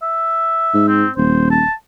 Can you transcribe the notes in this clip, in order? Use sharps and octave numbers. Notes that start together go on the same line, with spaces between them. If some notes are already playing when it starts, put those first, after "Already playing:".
E5
G#2
C4
D#1 C5
A5